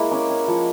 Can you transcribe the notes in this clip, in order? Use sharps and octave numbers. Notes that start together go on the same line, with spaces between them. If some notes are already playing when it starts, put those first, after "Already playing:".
Already playing: G#3 A#3 E4
C#4 D6
C#4
F3 C#6